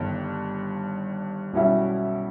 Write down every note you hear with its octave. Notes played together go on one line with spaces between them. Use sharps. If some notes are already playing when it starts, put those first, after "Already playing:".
Already playing: G1 G2 D#3
B1 B2 G3 C#4 E4